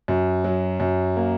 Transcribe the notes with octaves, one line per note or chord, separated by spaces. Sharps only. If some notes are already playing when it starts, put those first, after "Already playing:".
F#2
F#3
F#2
A#3